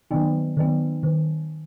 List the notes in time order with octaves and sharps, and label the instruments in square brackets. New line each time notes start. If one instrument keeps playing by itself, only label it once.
[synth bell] D#3 F#3 B3
D#3 F#3 B3
D#3